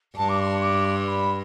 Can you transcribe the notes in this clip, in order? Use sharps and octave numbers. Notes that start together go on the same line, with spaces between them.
G2 A5
D6
C6
D6
C6
B5